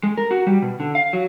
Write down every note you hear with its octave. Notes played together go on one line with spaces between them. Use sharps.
G#3
A#4
F#4
G3
B2
D3
F5
F#3